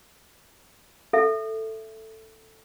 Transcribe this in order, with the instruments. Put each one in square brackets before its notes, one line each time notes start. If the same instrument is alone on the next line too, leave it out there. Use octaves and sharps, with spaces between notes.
[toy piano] A4 E5